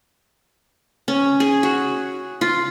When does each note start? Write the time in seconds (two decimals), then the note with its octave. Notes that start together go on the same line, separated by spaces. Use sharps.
1.08 C#4
1.40 G#4
1.63 F#4
2.41 F4